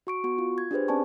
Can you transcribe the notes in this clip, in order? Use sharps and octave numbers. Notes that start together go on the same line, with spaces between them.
F#4 C#6 D7
B3 F#4 C#6
F4
G#6
D4 G4 G#4 B4 C5
C4 C#4 D5 G#5 A5 C#6